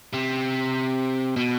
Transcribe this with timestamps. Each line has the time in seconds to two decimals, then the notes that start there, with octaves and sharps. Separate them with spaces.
0.13 C3
1.36 B2